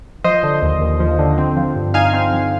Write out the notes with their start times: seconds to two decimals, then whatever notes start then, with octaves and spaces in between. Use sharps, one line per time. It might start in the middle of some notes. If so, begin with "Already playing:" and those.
0.24 F3 C5 D#5
0.43 D3
0.62 D#2
0.81 D#2
1.00 F3
1.19 D3
1.38 C4
1.57 F3
1.76 G2
1.94 D#4 F5 G#5
2.14 C4
2.33 F3